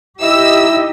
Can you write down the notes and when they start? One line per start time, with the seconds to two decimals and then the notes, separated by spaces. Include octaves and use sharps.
0.21 D#4 E4 G4 D#5 E5 E6